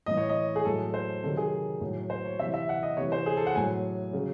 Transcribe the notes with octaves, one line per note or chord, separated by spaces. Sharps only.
A2 E3 D#5
C#5
D#5
G#4
A2 F#3 A4
C5
C3 D#3 F#3 A4
G#4
A2 F#3
C5
C#5
C3 E3 E5
E5
F#5
D#5
C3 E3 C#5
C5
G#4
A4
F#5
A2 F#3 G#5
C#3 F#3